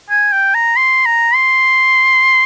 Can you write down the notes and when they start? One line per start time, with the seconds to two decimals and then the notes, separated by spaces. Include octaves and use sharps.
0.10 G#5
0.32 G5
0.54 A#5
0.76 C6
1.06 A#5
1.35 C6